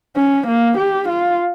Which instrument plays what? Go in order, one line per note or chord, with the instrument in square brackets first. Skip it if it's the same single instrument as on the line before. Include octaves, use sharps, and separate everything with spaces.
[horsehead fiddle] C#4
A#3
G4
F4